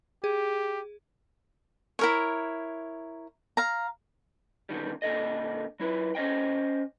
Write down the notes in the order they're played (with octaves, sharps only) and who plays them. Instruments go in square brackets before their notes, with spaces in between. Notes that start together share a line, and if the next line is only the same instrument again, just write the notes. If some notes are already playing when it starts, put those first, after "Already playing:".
[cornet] G4 [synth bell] G#4
[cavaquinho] E4 A#4 C#5
F5 A#5
[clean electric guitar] B2 D3 D#3 G3
A#2 D3 A4 D#5
F#3 E4 B4
C#4 C5 D#5 G5